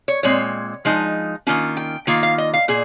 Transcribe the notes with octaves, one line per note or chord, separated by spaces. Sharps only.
C#5
A#2 G#3 C4 C#5
F3 G#3 D#4
D#3 A#3 C#4 F4
G5
D#3 A#3 F4 F5
F5
D#5
F5
A#2 G#4